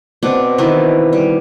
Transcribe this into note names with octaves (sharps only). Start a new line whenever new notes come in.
B2 C4 D4
D#3 E3 D4 E4
G3